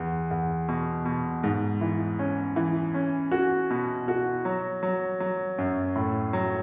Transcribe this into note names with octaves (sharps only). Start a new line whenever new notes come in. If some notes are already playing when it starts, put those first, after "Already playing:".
Already playing: E2
E2
B2
B2
G#2
E3
C#4
E3
C#4
F#4
B2
F#4
F#3
F#3
F#3
F#2
A2
F#3